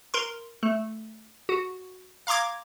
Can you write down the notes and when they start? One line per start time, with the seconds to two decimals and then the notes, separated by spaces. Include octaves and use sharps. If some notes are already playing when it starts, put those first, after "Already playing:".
0.14 A#4 C6
0.63 A3
1.49 F#4
2.27 F5 A#5 C6 D6 G#6